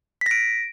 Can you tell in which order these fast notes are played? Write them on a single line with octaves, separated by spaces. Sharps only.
B6 A#6 D7